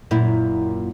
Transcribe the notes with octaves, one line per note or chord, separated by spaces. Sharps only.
F#2 A#2 E4